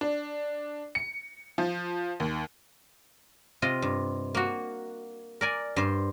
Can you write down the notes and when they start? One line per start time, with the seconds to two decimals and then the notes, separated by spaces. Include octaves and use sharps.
0.01 D4
0.95 C#7
1.58 F3
2.20 D#2
3.62 C3 F4 D#5
3.82 G2
4.35 A#3 F#4
5.41 A#4 D5 G#5
5.76 G2 C5